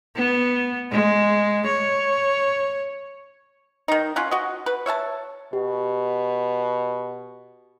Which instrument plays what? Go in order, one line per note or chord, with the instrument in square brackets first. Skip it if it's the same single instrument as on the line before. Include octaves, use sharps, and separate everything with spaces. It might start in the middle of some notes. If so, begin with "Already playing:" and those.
[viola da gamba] B3
G#3
C#5
[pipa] D#3 D#4
C#4 F4 F#5
F#4 D#5
B4
C#5 E5 F5 A5
[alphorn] B2 [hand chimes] G4